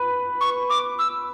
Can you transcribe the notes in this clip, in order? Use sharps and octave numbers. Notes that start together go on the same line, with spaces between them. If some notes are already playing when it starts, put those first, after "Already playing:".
Already playing: B4
C#6
D6
E6